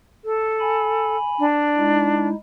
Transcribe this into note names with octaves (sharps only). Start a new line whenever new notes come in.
A4
G#5 B5
D4
G#3 D#4 E4